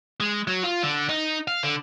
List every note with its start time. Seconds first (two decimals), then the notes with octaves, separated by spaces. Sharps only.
0.20 G#3
0.47 F#3
0.64 F4
0.83 D3
1.09 D#4
1.48 F5
1.63 D3